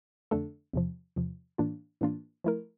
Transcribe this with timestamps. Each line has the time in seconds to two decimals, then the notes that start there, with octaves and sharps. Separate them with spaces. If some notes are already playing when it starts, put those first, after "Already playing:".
0.31 F2 D3 A3 D4 A4
0.73 E2 C3 F3
1.16 E2 C3 F3
1.58 A2 E3 A#3 D4 F4
2.01 A2 E3 A#3 D4 F4
2.44 F3 A3 E4 A#4